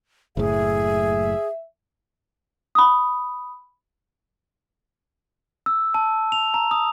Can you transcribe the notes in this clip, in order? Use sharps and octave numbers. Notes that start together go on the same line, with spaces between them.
F#1 A2 G#4 E5
B5 D#6
E6
A5
F7
A#5
D#6